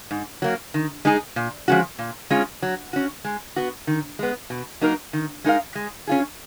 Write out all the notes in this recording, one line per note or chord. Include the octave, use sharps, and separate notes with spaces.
G#2
F#3 A#3
D#3
G#3 D#4 G#4
A#2
F3 G#3 C#4 F#4
A#2
G#3 C#4 F4
F#3
C#4 F#4
G#3
B3 F#4
D#3
G#3 B3
B2
F#3 A#3 D#4 A#4
D#3
G#3 D#4 A#4 F5
G#3
C#4 F4 G#4